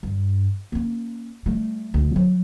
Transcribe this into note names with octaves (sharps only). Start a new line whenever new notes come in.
G2
A#3 C#4
G3 A3
D2
F#3